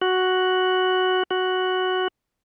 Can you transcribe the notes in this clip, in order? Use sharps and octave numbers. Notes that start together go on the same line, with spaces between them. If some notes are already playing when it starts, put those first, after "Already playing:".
F#4
F#4